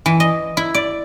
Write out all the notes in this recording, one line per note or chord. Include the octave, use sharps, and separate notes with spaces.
E3
D#5
E4
D5